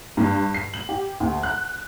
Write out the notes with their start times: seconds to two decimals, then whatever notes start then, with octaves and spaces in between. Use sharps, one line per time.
0.17 G2
0.54 C7
0.74 F#7
0.89 G4
1.20 D2
1.43 F#6